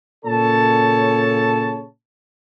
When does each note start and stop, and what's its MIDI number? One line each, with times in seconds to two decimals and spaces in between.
0.25 1.84 46
0.25 1.84 49
0.25 1.84 69
0.25 1.84 73
0.25 1.84 81